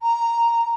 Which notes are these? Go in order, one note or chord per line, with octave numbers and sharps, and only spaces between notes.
A#5